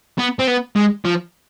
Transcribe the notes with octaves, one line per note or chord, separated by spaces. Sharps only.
B3
C4
B3
G#3
F3